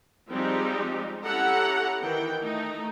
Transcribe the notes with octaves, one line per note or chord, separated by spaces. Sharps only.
F3 G3 G#3 C4 D#4 G4
C#4 E4 G4 A4 F#5 A#5
D#3 E3 G5
A3 D#4